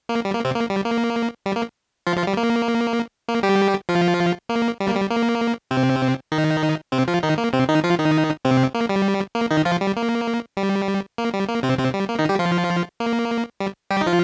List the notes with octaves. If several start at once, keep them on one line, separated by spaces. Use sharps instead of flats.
A#3
G3
A#3
C3 C4
A#3
G3
A#3
G3
A#3
F3 F4
F3 F4
G3
A#3
A#3
G3 G4
F3 F4
A#3
G3
A#3
G3
A#3
C3 C4
D#3 D#4
C3 C4
F3 F4
D#3 D#4
A#3
C3 C4
D#3 D#4
F3 F4
D#3 D#4
C3 C4
A#3
G3
A#3
D#3 D#4
F3 F4
G3
A#3
G3
A#3
G3
A#3
C3 C4
C3 C4
G3
A#3
D#3 D#4
G3 G4
F3 F4
A#3
G3
G3 G4
D#4
F3 F4